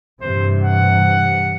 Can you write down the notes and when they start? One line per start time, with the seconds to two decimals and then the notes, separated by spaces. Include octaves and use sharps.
0.21 G2 C3 E3 C5
0.62 F#5